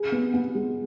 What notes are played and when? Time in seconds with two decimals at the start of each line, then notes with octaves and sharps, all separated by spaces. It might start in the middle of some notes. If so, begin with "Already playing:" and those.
Already playing: G#4
0.12 B3
0.34 B3
0.55 G#3